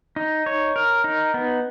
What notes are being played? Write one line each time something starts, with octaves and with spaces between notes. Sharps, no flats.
D#4
C#5
A#4
D#4
B3